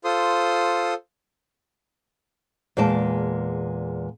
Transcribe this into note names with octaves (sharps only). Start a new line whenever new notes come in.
F4 A4 C5 C6 D#6
E2 A#2 G#3 D5 A5